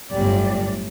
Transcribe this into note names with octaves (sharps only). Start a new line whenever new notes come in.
G1 A2 F#3 G3 D5